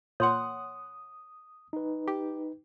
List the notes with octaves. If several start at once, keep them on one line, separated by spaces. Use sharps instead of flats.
A#2 C#5 F#5 C6 D#6
D#4 B4
G4